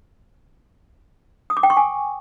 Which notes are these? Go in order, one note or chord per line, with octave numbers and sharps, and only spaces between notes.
D#6
D6
G5
C#6
G#5